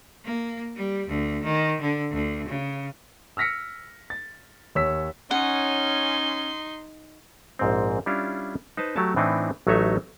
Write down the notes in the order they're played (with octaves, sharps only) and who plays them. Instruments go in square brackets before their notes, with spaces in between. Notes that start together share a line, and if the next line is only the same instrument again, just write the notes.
[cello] A#3
G3
D2
D#3
D3
D2
C#3
[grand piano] E6 F6 A#6 B6 C#7
A6
D#2 C#5 E6 B6
[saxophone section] C#4 [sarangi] D#4 [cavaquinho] F#5 [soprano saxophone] C6
[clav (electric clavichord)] A#1 G#2 C4
G3 C#4 D4 E4 F4 F5
D#4 B4 C5 A5
F#3 A3 G4 C#5 A5
A2 E3 C4 D4 D#4
A1 F#3 A3 D#4 C#5 E5